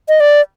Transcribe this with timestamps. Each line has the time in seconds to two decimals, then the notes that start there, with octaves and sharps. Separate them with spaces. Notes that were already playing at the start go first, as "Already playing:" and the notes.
0.09 D#5
0.20 D5